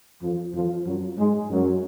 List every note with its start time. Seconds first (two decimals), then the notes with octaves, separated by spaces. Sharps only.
0.22 F2 F3
0.55 F2 F3
0.86 F#2 F#3
1.19 G#2 G#3
1.51 F#2 F#3